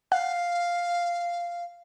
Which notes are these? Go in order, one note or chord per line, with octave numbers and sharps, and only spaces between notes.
F5 F#5